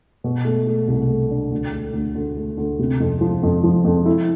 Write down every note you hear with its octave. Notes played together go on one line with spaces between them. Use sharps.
B2
A3
A3
C2
A3
D4
D2
A3
D2
D2
A3
D2
C3
F2
F3
F2
F3
F2
E4